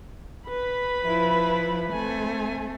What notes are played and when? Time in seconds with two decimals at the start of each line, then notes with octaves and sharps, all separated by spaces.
0.49 B4 B5
1.05 F3 E4
1.92 A3 C4 G#5